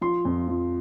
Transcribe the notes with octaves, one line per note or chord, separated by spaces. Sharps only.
F3 C6
F2
F3